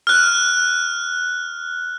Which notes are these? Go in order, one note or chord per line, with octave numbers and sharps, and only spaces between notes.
F6 F#6